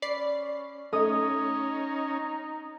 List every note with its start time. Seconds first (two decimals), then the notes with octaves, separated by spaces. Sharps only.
0.02 C#4 D5 B5 C7
0.93 A3 C#4 D#4 D#5 D#6